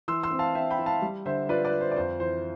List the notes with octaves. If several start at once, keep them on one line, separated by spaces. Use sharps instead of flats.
E3 C6 E6
C6 E6
C4
F5 A5
C4 E5 G5
G5 B5
E3
F5 A5
G3
D3 C5 E5
F4 B4 D5
B4 D5
F4
C5
D5
F2 C5
E3 C5